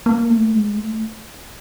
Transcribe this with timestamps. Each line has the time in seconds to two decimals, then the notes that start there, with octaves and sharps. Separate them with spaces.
0.06 A#3
0.30 A3
0.54 G#3
0.77 A3